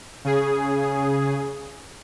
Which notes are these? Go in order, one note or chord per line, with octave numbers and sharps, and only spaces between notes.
C#3 G#4